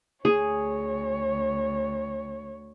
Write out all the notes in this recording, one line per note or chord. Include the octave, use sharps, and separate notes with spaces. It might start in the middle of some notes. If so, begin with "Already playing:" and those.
D2 G#4 C#5